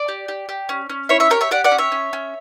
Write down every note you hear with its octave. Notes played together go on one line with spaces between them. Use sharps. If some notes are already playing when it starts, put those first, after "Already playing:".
Already playing: D5
G4
G4
G4
C#4
C#4
E4 C#5 E5
C#5 E5
G4 A#4 C#5
C#5 E5
G4 D5 F#5
D5 F#5
C#4
C#5 E5
C#4
C#4